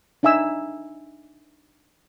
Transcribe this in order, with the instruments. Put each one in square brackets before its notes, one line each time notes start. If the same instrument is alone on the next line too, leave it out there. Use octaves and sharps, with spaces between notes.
[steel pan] D4 D#4 E5 G#5 E6